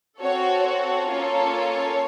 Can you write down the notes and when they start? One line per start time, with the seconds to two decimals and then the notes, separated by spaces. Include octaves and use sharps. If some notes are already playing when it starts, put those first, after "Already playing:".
0.20 C4 F#4 A4 C#5
0.64 C#5
1.08 A#3 C#4 F4 A4